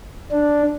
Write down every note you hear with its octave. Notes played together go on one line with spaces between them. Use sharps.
D4